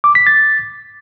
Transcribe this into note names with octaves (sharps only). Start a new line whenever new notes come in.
D6
B6
A6